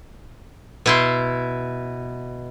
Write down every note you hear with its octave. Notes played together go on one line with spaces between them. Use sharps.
B2 E4 C6